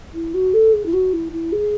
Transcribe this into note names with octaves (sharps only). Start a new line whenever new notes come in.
E4
F#4
A4
G#4
E4
F#4
E4
E4
G#4